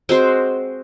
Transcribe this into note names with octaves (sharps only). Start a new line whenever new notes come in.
G#3 C4 F#4 C5